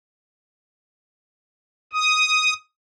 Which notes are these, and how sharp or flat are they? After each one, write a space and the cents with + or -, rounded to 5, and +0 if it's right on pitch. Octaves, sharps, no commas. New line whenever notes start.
D#6 +5